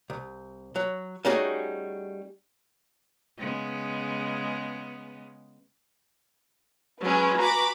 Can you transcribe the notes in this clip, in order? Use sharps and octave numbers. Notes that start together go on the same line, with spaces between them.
C2
F#3
G3 A3 C#4 D#4 F#4 G#4
C#3 G#3 B3
F#3 G#3 C#4 B4 G#5
F#4 A#5 B5 D6